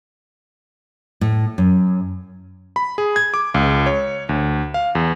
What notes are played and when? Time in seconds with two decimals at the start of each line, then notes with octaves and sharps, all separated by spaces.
1.21 A2
1.58 F#2
2.76 B5
2.98 G#4
3.16 G#6
3.34 D6
3.54 C#2
3.86 C#5
4.29 D2
4.74 F5
4.95 E2